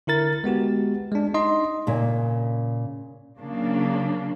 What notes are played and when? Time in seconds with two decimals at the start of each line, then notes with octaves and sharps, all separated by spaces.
0.07 D3 E4 A#4 A6
0.44 G#3 B3 F#4 G4
1.12 G#3 D4
1.34 D#4 D#5 C6
1.87 A#2 C#3
3.39 C#3 F#3 A#3 D4